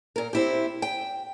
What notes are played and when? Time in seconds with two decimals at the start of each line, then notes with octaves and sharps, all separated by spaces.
0.16 A#2 A#4
0.33 C4 E4 G4
0.82 G5